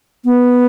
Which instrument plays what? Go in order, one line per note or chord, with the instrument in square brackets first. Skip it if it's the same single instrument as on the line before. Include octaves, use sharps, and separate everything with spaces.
[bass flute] B3